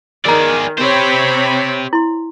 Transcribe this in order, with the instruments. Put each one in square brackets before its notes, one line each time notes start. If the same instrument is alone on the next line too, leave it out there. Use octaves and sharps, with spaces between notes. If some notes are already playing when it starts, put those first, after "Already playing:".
[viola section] D#3 [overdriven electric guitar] G#4 D5 [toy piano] A#5 E6
[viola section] C4 C#5 B5 [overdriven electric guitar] G4 C5
[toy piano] E4 C6